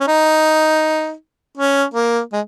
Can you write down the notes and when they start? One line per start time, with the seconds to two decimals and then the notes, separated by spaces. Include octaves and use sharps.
0.01 C#4
0.08 D#4
1.57 C#4
1.94 A#3
2.33 G#3